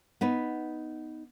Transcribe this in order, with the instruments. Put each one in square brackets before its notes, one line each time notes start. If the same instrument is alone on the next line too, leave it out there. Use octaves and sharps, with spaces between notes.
[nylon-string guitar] B3 D#4 B4